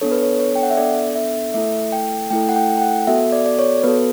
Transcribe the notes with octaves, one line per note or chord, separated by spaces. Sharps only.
B3 D4 A4 C#5
B4
C#5
C#5
G5
F#5
E5
B3 D4 A4 D5
E5
A3 E4 A4 E5
G5
A3 E4 A4 G5
F#5
G5
G5
F#5
B3 F#4 A4 E5
D5
D5
C#5
B3 F#4 A4 B4